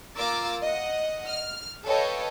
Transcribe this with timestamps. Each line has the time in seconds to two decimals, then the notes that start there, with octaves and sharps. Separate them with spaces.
0.15 A#3 F4 A#4 D6 E6 A6
0.61 D#5 F#5
1.27 F6
1.85 A4 B4 C#5 D#5 F5 G5